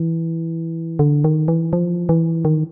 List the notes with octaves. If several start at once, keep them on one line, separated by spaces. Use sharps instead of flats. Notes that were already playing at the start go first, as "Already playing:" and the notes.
Already playing: E3
D3
D#3
E3
F3
E3
D#3